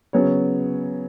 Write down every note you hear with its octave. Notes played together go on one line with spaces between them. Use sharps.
C#3 F#3 B3 G#4 C#5